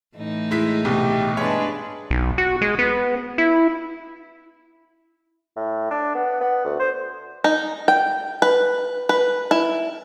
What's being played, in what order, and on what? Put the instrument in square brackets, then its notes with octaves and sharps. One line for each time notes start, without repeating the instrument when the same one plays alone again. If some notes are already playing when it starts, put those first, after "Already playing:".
[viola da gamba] A2 E3 D#4
[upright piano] G#3 E4 B6
[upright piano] C2 B2 [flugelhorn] G4
[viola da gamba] G2 D4 B4 [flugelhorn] G#3 [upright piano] C#5
[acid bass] B1
F#4
G#3
B3
E4
[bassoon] A2
D4
B3
B3
D2
C5
[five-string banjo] D#4
G5
B4
B4
E4